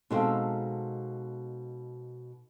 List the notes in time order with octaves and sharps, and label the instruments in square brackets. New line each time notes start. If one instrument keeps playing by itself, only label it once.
[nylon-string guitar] B2 G#3 C4 [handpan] D#4 A4 F5